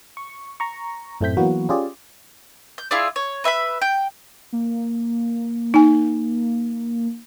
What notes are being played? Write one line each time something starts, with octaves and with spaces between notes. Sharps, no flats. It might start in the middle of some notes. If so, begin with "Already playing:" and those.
C#6
A#5 C#6
F#2 A2 A3 C4 G6 B6
E3 F#3 A#3 B3 F#4
C#4 F4 G4 G#4 D5
G6
E4 F4 G#4 D5
C#5
B4 E5 G#5 B5
G5
A#3
D#4 G#5